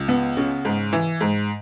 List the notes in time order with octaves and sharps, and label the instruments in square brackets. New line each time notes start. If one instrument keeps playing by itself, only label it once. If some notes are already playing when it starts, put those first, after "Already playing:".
Already playing: [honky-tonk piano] C#2
B3
C#3
G#2
E3
G#2